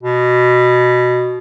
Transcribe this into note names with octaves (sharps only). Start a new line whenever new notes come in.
B2